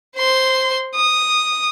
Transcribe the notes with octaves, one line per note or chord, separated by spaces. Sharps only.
C5 C6
D#6